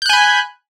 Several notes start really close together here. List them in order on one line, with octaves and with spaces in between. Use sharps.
G6 F#6 G#5 B5